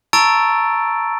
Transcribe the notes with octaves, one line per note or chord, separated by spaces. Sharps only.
A5 A#5 C#6 E6 A6 D7